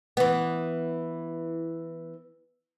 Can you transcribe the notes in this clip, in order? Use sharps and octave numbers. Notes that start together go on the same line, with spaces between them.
E3 B3